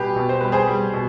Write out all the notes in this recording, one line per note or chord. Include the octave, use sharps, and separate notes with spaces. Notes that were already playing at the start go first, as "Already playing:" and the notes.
Already playing: B2 G3 G4 G#4 B4
B2
C5
G3 B4
G#4 C5
G3
B2